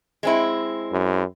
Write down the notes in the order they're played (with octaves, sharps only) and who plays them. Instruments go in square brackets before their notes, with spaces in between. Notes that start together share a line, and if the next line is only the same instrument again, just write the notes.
[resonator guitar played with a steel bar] G#3 C4 E4
[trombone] F#2